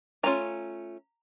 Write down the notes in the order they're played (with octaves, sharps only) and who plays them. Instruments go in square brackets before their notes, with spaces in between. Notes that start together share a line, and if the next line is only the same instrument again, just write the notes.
[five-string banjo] F3 A3 C#4 F4 A#5